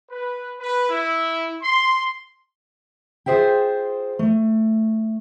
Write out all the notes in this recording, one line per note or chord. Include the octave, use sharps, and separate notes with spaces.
B4
B4
E4
C6
F4 G#4 C5 E5 G5
A3